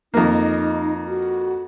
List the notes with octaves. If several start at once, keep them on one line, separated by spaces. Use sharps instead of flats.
F2 A#3 D#4
F#4